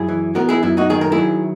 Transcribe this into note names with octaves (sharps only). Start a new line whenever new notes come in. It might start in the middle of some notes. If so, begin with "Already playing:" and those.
Already playing: F#2 E4 G#4
E3
B3 F#4 A#4
E4 G#4
F#2 E4
D#4 F#4
D#3 G#4
A#4
E4 G#4
F#3